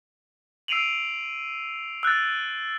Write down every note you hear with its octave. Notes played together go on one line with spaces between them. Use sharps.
E6 C7 D7 D#7 F7 F#7
E6 F#6 G6 A6